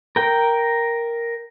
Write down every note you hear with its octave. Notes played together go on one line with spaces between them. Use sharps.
A#4 G5